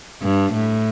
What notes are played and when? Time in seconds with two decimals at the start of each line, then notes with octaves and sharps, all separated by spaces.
0.22 G2
0.54 A2